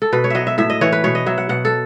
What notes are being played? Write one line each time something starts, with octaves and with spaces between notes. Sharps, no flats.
A4
B2 B4
C#5
F#3 D#5 E5
E5
A2 E5
D#5
E3 C#5
B4
B2 C#5
D#5
F#3 E5
F#5
B2 F#5
A4